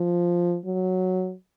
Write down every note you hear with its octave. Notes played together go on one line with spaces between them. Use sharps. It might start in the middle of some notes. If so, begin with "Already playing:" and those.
Already playing: F3
F#3